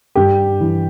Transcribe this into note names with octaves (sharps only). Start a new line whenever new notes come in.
G2 G4
E3